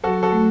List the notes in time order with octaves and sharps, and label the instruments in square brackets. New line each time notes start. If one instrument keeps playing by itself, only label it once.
[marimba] F#3 [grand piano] F#4 A4
[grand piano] F#4 A4
[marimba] A3